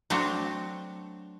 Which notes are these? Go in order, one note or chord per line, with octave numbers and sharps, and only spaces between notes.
F#3 A3 C4 D4 F#4